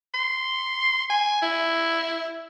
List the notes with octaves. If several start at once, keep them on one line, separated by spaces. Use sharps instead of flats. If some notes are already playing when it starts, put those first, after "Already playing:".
C6
G#5
E4